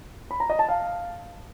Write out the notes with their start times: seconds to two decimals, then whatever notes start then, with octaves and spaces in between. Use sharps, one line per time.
0.31 B5
0.40 A#5
0.50 D#5
0.59 A5
0.69 F5